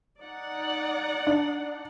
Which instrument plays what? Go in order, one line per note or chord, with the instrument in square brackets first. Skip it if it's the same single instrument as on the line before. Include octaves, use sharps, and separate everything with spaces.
[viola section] D#4 D5 F#5
[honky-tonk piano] D4